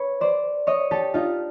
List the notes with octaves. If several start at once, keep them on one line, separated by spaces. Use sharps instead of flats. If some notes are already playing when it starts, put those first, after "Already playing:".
Already playing: B4 C#5
C5 D5
C#5 D#5
G4 A4
D#4 F4